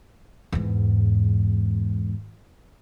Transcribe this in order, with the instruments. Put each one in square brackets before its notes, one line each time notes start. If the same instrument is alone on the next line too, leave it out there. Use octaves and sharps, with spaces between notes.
[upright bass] E2 G#2